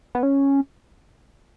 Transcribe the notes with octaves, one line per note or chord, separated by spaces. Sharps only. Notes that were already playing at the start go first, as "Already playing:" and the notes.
B3
C#4